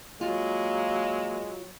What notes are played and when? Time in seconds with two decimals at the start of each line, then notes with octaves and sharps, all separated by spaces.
0.21 F#3 G#3 A#3 F4